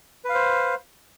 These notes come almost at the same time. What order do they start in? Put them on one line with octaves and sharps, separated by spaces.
B4 F5 C5